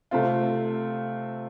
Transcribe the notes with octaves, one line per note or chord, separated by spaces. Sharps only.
C3 A3 C4 F4